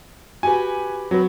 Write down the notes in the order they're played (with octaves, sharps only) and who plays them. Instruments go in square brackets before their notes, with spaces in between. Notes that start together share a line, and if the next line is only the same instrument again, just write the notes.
[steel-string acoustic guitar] F#4 G4 B4 [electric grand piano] G#5
[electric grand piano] F#3 [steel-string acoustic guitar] C4 B4